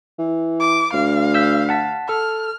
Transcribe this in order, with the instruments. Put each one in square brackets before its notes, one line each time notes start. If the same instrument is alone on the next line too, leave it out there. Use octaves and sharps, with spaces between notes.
[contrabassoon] E3
[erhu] D6
[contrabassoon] D2 [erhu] F5
[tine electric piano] E6 G6 B6
F#5 A5 B6
[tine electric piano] A4 [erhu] F6